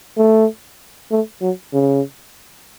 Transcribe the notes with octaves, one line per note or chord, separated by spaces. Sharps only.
A3
A3
F#3
C#3